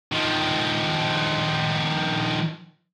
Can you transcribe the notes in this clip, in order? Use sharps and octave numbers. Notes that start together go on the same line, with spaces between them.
D#3 F3